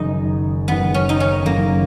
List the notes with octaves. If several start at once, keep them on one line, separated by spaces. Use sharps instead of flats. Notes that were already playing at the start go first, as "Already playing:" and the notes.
Already playing: F#1 F#2 D#3 D#4
F#1 F#2 D#3 B3
C#4
D#4
C#4
F#1 F#2 D#3 A#3